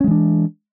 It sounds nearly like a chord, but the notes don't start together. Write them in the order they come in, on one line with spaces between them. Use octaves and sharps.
C#4 G#3 E3 D4